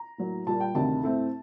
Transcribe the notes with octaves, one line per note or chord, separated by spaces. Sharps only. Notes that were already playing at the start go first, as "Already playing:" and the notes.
Already playing: A#5
A2 F#3 A#3
A#2 G3 A#3 A5
G5
D2 C3 D#3 A5
A2 A3 C4